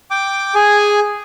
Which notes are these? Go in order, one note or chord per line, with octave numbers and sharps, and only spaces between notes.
G5 D6
G#4 G#5